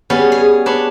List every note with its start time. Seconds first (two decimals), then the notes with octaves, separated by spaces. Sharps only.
0.10 G3 B3 C#4 G#4
0.32 G#4
0.66 D4 B4 C#5